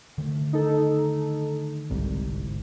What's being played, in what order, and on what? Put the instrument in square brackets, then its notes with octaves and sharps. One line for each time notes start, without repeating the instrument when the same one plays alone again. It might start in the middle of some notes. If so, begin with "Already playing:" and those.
[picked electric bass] D3 D#3 A3
[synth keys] D#4 A4
[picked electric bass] G1 G#2 [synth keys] C2